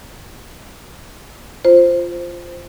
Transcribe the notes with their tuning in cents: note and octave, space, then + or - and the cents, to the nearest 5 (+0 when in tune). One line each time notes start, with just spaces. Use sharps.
F4 -5 C5 +0